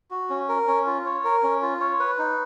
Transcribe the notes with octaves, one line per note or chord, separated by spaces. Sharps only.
F#4
C#4
A#4
C#4
F4
C#5
A#4
C#4
F4
C#5
B4
D#4